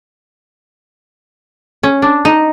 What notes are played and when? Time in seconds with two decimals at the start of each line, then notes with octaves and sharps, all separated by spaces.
1.83 C#4
2.02 D4
2.25 D#4